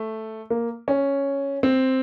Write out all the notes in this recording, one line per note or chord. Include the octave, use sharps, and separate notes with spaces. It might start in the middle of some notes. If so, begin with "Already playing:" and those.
Already playing: A3
A#3
C#4
C4